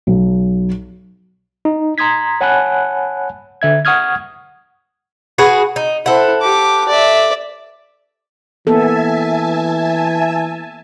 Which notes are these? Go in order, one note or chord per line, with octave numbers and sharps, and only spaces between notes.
B1
D#4
A#5 C6 D#6 G#6 B6
C#5 F#5 G#5 A5 B5 F#6
D3 E5 G#6
F#5 C#6 D#6 F6 G#6
F#4 G#4 B4
D#4
E4 A4 C5 F#5
G4 D6
D5 E5
E3 A#3 B3 A4 E5 G#5 A5